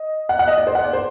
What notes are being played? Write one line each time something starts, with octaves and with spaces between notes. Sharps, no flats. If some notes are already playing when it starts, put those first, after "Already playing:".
Already playing: D#5
F#5
F#5
D#5
D5
C5
F#5
D5
C5